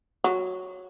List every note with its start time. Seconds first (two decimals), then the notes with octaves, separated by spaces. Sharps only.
0.24 F#3